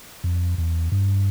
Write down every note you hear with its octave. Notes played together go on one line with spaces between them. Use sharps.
F2
E2
G2